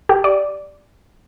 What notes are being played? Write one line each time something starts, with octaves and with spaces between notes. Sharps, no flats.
G4
D5